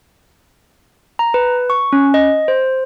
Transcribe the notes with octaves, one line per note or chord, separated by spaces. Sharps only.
A#5
B4
C#6
C#4
D#5
C5